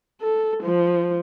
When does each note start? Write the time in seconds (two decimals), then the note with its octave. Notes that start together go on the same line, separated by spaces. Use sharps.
0.22 A4
0.63 F3